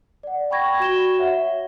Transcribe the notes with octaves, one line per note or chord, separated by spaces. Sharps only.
D5 F#5
G5 B5 C#6 G#6 A#6
F#4 E7 G7
C#5 E5 F#5